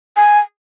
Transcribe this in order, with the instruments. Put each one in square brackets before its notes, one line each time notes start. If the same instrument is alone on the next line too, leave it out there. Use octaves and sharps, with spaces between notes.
[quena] G#5